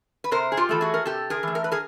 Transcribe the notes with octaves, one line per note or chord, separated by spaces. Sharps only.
B4
C3 A#4 C5
G#4
F4 G4
E3 A3 A4
F#4 G#4
A#4
C3 G4 A4
G#4 A#4
E3 A3
A#4
B4
G#4 A#4